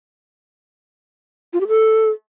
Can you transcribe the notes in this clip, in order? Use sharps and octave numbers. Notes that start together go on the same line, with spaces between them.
F4
G4
A4